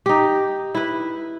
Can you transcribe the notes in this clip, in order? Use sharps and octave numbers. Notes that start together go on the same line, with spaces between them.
D#4 G4
E4 B4